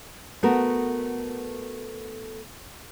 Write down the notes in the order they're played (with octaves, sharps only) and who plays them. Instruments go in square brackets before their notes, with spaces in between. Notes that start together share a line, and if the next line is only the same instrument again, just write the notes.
[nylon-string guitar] A3 B3 F#4 A#4